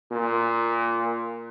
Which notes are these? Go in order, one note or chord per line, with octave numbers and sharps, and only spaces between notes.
A#2